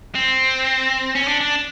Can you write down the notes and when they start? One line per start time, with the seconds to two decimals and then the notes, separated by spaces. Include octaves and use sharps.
0.15 C4
1.15 C#4
1.27 D4
1.41 D4